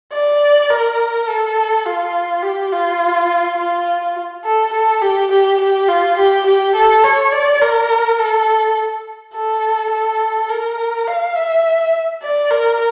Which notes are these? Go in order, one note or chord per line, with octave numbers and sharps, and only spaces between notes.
D5
A#4
A4
F4
G4
F4
F4
A4
A4
G4
G4
G4
F4
G4
G4
A4
C#5
D5
A#4
A4
A4
A4
A#4
F5
E5
D5
A#4